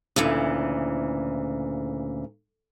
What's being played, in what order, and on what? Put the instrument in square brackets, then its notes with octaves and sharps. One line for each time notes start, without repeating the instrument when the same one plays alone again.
[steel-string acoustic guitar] D2 A#2 C#3 E3